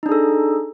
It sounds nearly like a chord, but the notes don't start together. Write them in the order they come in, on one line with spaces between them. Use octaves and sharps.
D#4 D4 G#4 A4